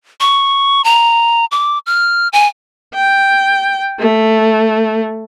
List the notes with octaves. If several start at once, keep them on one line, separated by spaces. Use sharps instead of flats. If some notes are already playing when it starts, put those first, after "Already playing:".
C#6
A#5
D6
F6
G#5
G5
A3